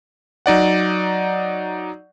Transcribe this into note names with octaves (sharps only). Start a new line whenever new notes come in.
F#3 D#4 D5 F#5